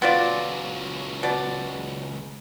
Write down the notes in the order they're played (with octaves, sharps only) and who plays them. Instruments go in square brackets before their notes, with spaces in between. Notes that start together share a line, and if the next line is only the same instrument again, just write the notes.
[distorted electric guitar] C#2 F#3 [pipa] B3 F4 D5
[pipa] B2 D5